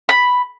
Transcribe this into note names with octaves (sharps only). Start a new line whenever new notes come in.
B5